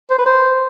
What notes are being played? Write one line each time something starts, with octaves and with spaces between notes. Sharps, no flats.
C5
B4
C5